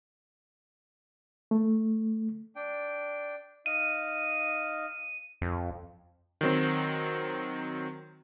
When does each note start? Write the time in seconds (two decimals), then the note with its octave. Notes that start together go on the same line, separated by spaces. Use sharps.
1.51 A3
2.56 D4 G5
3.66 D#4 F5 D#7
5.41 F2
6.41 D#3 F#3 C4